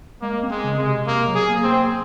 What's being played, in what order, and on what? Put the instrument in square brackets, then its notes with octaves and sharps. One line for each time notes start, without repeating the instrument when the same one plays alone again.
[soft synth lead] G#3 [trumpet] A#3
[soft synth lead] C4
[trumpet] G#3
[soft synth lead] C#3
[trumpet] G#3
[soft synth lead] C3
[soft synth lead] C3 [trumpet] A#3
[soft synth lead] F#3
[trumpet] G#4
[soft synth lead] A#3
[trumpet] C4
[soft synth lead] A#3